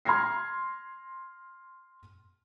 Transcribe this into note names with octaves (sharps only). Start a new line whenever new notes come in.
C6 F6 G#6 A#6 C7